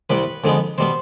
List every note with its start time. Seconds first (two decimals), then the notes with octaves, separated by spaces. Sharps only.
0.10 C2 C3 G3 B4
0.44 F2 D3 G#3 B3
0.78 B2 G3 B3 C5